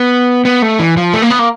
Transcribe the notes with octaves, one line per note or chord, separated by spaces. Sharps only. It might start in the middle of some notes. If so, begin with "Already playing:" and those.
Already playing: B3
B3
A3
E3
F3
A3
A#3
B3
A#3